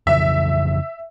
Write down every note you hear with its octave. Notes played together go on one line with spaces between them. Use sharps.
F2 C#3 E3 E5